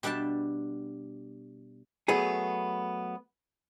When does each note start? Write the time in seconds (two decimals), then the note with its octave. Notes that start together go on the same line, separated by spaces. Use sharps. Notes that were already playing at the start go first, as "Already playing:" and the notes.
0.03 B2 G3 D4 E5 G5 A5
2.08 F#3 A3 B3 G#4